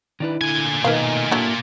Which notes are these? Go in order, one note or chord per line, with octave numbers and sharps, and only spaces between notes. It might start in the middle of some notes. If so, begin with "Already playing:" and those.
D#3 D4 E4 B4
A#2 D3 G#5
B2 D#3 A3 A#3 A#4 B4 F5
F#3 A#3 D4 E4 A4